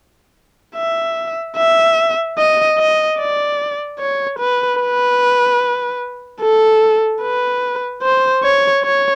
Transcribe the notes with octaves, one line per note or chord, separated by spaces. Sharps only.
E5
E5
D#5
D#5
D5
C#5
B4
B4
A4
B4
C5
C#5
C#5